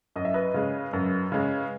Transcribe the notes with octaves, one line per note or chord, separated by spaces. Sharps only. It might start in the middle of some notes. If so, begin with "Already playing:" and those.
F#2 D#5
E5
B4 D#5
C#3 G#3
F#2
C#3 G#3